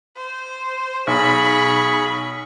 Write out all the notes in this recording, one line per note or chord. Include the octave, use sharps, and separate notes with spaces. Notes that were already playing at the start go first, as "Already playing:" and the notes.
C5
B1 G#4 B5 C#6